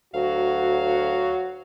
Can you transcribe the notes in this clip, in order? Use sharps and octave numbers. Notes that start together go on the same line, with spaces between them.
D2 F#3 F#4 F5